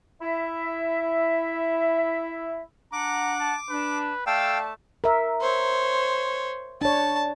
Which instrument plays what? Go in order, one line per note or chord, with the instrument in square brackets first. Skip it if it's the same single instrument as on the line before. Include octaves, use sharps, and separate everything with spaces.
[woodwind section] E4 E5
[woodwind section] D4 F#5 [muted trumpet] A#5 [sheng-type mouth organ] D6
[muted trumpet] A5
[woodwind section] D4 [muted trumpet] B4
[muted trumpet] A3 [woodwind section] A4 D5 A5 [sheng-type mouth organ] F5 G5 E6
[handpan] A#4 E5
[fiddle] C5 C#5
[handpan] D4 C#5 [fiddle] A5